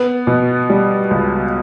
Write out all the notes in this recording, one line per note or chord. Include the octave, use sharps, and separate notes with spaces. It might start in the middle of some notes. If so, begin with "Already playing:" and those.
Already playing: B3
B2
G3
C#2